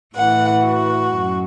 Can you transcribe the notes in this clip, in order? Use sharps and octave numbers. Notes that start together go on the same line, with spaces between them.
A2 E3 F#5
F#4
F#2